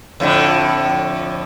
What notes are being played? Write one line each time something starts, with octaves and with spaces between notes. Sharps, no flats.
F2 A2 D3